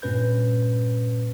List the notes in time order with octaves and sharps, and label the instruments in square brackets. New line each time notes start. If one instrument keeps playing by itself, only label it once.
[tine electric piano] G2 A#2 C#4 B4 G6